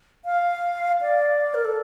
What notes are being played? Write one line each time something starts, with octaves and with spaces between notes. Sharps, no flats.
F5
D5
A#4
A4